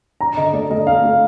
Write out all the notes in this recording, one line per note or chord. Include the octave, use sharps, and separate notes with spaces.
D4 A#5
D3 D#5
A3 D5
A3 D#5
A3 F5
A3